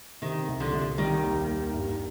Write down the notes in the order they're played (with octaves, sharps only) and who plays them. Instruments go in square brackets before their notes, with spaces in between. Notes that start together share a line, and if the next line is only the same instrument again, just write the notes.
[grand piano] C3 [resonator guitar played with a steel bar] D#3
[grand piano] C2
[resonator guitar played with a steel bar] D3 F3
[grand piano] C2
[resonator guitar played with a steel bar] D#3 [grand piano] G3
[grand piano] D#2
A#3
G2